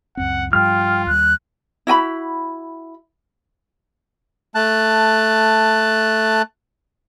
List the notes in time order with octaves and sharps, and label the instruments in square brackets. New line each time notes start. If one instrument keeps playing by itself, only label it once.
[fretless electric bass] C#2 F#2 C4 [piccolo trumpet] F#5
[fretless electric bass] G2 F3 G3 [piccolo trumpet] F4 [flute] G5 [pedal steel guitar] F6
[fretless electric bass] D#2 G3 [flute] F#6
[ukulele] E4 F#4 G#5 B5
[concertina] A3 A5 F#6